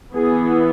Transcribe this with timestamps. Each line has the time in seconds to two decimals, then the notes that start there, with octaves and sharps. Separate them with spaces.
0.13 E3 B3 E4 G#4